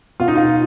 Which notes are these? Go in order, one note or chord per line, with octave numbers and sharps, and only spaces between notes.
B2 F4
D#4
F4